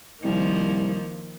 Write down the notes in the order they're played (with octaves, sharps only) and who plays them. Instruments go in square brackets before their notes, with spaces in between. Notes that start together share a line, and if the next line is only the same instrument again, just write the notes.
[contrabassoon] C2 [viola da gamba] D#3 F3 A#3